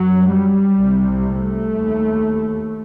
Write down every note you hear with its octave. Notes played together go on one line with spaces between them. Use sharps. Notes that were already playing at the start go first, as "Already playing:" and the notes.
Already playing: F#2 F#3
G3
C2 C3
A3
D#2